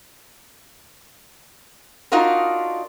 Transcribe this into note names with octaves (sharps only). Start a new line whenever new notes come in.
D4 D#4 F4 F#4 A#4